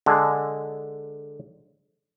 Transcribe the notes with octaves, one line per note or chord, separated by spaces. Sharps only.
D3 G#3